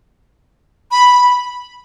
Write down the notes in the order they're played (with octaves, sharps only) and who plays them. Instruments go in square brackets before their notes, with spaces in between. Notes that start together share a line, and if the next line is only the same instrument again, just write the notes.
[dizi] B5